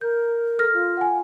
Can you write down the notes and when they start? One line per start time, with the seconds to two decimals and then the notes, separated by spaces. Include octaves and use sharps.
0.01 A#4 G6
0.59 A4 F6 A#6
0.74 F4
0.97 F#5 G#5